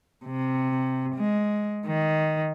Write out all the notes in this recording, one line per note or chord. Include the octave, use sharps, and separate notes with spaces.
C3
G#3
D#3